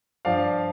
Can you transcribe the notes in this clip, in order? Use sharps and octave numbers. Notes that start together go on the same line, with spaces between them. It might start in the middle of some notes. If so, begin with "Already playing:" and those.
G2 F3 D5 F5